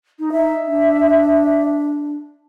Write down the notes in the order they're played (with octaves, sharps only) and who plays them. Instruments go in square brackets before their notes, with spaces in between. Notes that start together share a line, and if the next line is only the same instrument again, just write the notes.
[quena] D#4
[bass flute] D#4 [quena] E5
[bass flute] D4